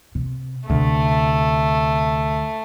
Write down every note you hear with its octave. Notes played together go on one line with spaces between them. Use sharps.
C3
D2 C3 A3